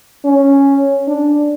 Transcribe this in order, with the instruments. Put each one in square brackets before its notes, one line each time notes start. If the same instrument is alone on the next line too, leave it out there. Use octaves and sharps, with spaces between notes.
[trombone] C#4
D4